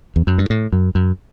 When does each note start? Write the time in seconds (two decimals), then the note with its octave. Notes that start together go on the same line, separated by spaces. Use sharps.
0.16 E2
0.27 F#2
0.38 G2
0.50 A2
0.72 F#2
0.95 F#2